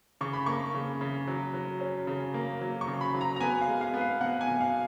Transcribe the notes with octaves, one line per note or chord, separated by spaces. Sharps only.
C#3 C#6
B5
A#3 C#6
C#3
C#3
F#3
F#3
C#4
C#3
A#3
F#3
C#6
C#3
B5
F#3
A#5
A#5
B3 G#5
F5
G#3
F5
B3
F5
B2 F#5
G#5
B2
F5